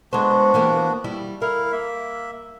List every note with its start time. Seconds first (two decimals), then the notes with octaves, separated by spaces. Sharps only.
0.13 G#3 B3 D4 F#4 C5
0.54 E3 A#3 G4
1.04 G3 E4
1.42 E4 A#4 F5
1.72 A#3 E5